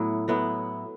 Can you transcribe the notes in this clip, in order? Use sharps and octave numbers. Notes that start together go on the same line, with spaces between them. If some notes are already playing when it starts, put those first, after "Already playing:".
Already playing: A2 F#3 B3 E4
A2 F#3 B3 E4